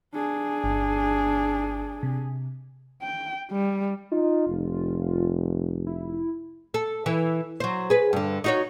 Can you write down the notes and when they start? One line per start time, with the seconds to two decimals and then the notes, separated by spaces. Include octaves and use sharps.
0.14 D4 G#4
0.64 G1
2.03 C3
3.02 G5
3.51 G3
4.12 D#4 F4
4.47 F1
5.87 E4
6.74 A4
7.06 E3
7.60 F#3 C5
7.90 G#4 B4
8.13 G2 D3
8.44 D#4 F#4 C#5